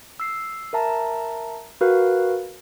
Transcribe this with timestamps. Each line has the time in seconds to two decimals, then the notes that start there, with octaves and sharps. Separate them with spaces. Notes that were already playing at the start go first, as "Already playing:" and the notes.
0.20 E6 C7
0.73 A#4 E5 A5 A#5
1.81 F#4 A#4 B4 F5